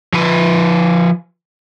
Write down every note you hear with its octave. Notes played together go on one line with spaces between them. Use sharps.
F3 B4